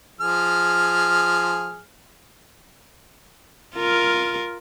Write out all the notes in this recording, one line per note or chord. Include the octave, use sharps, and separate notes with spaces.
F3 G#4 F6
F4 A#4